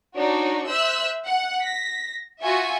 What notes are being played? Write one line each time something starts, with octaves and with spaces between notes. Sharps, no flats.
D4 D#4 F#4 C#5
C5 E5 E6 F#6
F#5
A#6 B6
F4 F#4 E5 G#5 C#6